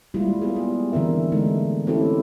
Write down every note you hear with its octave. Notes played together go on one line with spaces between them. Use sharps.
G3 G#3 A#3 E4 F4
B3 F4 G#4
G4 G#4
D3 E3 C4 A#4 E5
G#3 A3 D#4
C4 C#4 E4 G4 A4